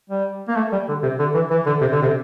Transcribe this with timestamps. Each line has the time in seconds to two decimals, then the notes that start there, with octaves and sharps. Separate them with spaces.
0.10 G3
0.48 A#3
0.56 A3
0.72 G3
0.88 D3
1.03 C3
1.19 D3
1.34 E3
1.50 E3
1.66 D3
1.81 C3
1.92 D3
2.02 C3